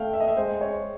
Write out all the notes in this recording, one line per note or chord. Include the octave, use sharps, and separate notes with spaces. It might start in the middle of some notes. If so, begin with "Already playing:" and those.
Already playing: A3 F5 G5
E5
D#5
E5
G#3 C5
C#5